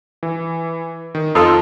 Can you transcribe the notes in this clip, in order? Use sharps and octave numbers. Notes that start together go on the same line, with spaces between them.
E3
D#3
F2 D#4 F4 A4